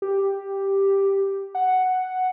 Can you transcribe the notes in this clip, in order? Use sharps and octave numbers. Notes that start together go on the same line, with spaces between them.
G4
F#5